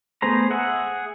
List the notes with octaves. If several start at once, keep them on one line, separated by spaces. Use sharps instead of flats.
A3 B3 G#4 C5 A#5
G#4 E5 F#5